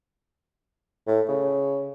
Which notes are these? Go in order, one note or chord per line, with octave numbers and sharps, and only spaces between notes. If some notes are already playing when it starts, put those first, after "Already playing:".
A2
C#3